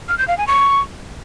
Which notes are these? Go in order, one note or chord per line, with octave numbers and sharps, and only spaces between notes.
F6
G6
F5
G#5
C#6